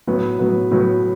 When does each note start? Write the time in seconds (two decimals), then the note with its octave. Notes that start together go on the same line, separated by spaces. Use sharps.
0.07 A2 F#3 B3
0.39 A2 F#3 B3
0.71 A2 F#3 B3